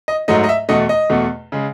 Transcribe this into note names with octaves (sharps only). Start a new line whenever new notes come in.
D#5
G#2 F#3 A3 D#5
D#5
E5
E2 B2 A3 D#5
D#5
E2 B2 A3
C#3 G#3